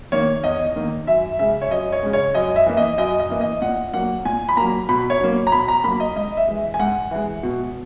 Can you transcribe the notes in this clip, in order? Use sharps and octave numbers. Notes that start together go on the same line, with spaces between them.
D#3 A#3 C#5
E2 D#5
D#3 A#3
F#2 E5
C#3 G#3 E5
C#5
F#2 D#5
C#5
C#3 G#3
C#5
F#2 D#5
E5
E3 A#3
D#5
F#2 D#5
D#5
E3 A#3
D#5
A#2 F#5
F#3 A#3 F#5
A#2 G#5
B5
F#3 A#3 A#5
B2 B5
C#5
F#3 A#3
A#5
B2 B5
A#5
F#3 A#3 B5
D#5
G#2 D#5
E5
E3 G#3
G#5
G#2 F#5
E3 G#3
B2